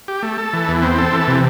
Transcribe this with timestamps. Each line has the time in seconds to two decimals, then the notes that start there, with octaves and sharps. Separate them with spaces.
0.08 G4
0.23 A3
0.38 A4
0.53 E3
0.68 E2
0.82 C4
0.98 A4
1.13 E3
1.28 C3